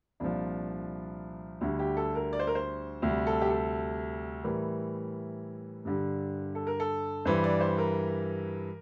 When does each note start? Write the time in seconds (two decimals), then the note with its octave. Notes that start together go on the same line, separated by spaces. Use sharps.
0.20 C2 A#2 F3 D4
1.61 D2 D3 G3
1.79 G4
1.97 A4
2.15 A#4
2.33 D5
2.39 C5
2.47 A#4
2.55 C5
3.02 D2 C3 G3
3.27 A4
3.41 G4
3.50 A4
4.44 A2 E3 G3 A#4
5.85 G2 D3 G3
6.55 A4
6.67 A#4
6.80 A4
7.25 G2 E3 G3 C5
7.44 D5
7.60 C5
7.78 A#4